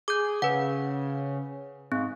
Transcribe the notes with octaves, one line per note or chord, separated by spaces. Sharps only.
G#4 D6 G6
C#3 B4 F#5
G#2 C4